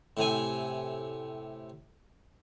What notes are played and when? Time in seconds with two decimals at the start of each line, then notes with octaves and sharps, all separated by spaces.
0.17 A2 C3 G#5